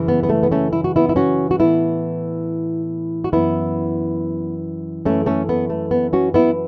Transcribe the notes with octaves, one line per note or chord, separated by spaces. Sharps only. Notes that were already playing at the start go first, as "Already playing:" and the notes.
Already playing: F#2 C#3 E3
B3
B3
A3
B3
A3 C#4
E4
F#4
B3 E4
E4
C#4 F#4
F#4
A2 E3 B3 E4
F#4
F#2 E3 B3 E4
F#2 E3 A3 C#4
A3 C#4
B3
A3
B3
C#4 F#4
B3 E4